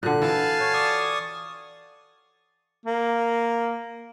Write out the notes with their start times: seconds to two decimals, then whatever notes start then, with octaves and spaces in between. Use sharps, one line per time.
0.03 A#2 D3 F#4 A4 F#5 F#6
0.22 E3 F5 G#5 A5
0.60 C#5
0.74 D5 C#6 D#6
2.86 A#3